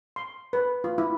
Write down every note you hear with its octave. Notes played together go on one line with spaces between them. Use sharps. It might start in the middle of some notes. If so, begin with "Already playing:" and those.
C6
B4
F4
E4